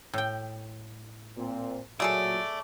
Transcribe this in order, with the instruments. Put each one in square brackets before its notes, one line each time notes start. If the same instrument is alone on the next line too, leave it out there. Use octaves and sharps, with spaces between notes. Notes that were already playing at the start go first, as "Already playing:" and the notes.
[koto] A2 G5
[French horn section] A#2 C4
[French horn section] A#2 F#3 [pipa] A3 G#4 A4 [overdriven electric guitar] D5